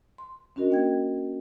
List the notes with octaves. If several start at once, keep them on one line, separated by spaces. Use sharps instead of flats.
C6
C#4 D4 F#4 A#4 D#5
A#3 G5 G#6